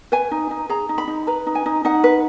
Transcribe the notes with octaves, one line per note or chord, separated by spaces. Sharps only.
B4 G#5
D#4
D#4
G#4 A#5
D#4
B5
D#4
B4 A#5
D#4
G#5
D#4
D#4 F#5
B4